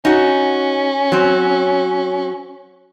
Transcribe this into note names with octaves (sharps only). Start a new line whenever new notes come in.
C#4 D#4 F#4
F#3 C4